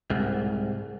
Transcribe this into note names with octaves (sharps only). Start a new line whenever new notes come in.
C2 G#2